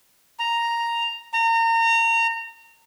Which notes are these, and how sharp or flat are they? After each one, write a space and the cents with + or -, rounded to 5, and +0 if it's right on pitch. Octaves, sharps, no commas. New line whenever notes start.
A#5 +0
A#5 -30